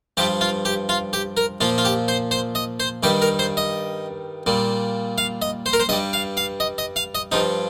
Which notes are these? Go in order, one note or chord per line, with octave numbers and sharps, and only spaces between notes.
G2 F3 G4
F4
G4
F4
G4
A#4
A#2 F3 F4
F4
G4
C5
C5
D#5
C5
G2 D#3 G3 G4
A#4
C5
D#5
A#2 G3
F5
D#5
C5
A#4
C5
G2 G3 D#5
F5
F5
D#5
D#5
F5
D#5
G2 F3 D#4